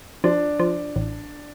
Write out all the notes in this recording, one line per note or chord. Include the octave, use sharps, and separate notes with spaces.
F3 D4
F3
A1